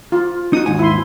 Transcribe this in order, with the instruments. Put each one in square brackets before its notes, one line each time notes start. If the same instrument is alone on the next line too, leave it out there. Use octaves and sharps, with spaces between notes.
[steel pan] F4
[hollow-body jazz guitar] D#4 F#4 [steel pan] D#6
[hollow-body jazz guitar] D#2 G#2 G#5
[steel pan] E4 C6